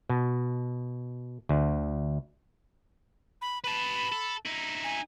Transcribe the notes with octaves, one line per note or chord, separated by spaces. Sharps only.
B2
D2
B5
B4 A5 B5
A4
D#4 E4
G#5